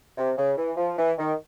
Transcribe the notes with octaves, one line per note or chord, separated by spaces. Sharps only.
C3
C#3
E3
F3
E3
D#3